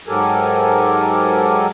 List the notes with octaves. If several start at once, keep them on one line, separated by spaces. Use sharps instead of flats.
G#2 F#3 G4 A4 A#4 G#5